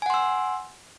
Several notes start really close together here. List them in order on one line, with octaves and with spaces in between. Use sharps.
G#5 F#5 C6 E6